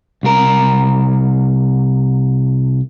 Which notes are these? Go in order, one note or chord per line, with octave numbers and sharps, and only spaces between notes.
C2 A#4